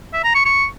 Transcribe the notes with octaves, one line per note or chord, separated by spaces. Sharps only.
E5
A#5
C#6
C#6